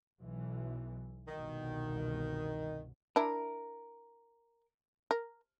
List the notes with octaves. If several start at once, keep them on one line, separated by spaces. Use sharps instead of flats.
B1 E3
G1 C2 B2 D#3
D4 E4 A#4
A#4